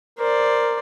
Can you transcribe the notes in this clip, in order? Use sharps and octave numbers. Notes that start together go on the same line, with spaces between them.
A#4 C5 D5